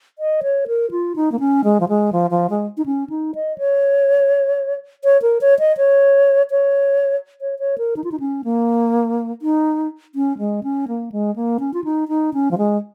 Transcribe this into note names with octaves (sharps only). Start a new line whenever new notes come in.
D#5
C#5
A#4
F4
D#4
A#3
C#4
G#3
F3
G#3
F3
F3
G#3
D#4
C#4
D#4
D#5
C#5
C#5
A#4
C#5
D#5
C#5
C#5
C#5
C#5
A#4
D#4
F4
D#4
C#4
A#3
D#4
C#4
G#3
C#4
A#3
G#3
A#3
C#4
F4
D#4
D#4
C#4
F3
G#3